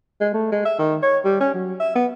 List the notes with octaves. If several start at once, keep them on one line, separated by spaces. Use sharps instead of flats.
G#3
A3
G#3
E5
D#3
C#5
G3
C#4
F#3
E5
B3